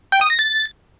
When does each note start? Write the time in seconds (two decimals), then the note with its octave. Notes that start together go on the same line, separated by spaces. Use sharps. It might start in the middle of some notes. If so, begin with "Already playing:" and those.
0.12 G5
0.21 D#6
0.30 A#6
0.39 A6